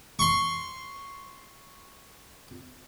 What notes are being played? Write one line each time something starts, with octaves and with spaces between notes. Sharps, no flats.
C6 C#6